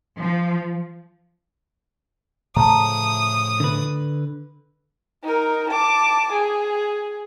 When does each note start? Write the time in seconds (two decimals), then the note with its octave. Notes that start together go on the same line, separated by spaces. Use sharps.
0.18 F3
2.56 A2 C#3 F3 A5 A#5 D#6
3.60 D3 B4
5.23 D#4 A#4
5.69 A5 D6
6.32 G#4